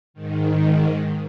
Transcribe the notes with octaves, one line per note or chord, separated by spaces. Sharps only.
G#2 D#3